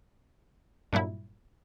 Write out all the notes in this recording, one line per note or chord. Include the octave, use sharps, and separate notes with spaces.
G2 A#2 F#3 E4